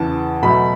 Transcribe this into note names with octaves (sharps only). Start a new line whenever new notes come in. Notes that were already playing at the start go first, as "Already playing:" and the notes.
Already playing: E2 C#3 E3 A5
B2 F#3 A3 B5